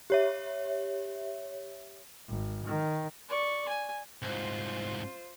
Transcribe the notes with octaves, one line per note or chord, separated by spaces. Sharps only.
G4 C#5 E5
G#1
D#3
D5 C#6
G#5
C2 G#2 F4 C5